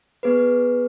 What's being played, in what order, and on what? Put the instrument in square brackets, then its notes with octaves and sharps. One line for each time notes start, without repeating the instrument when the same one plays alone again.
[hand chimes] B3 G#4 B4